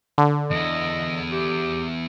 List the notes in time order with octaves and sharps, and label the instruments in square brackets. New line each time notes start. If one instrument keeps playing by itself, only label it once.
[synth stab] D3
[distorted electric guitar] E2 E4 [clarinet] D#5
[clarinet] G4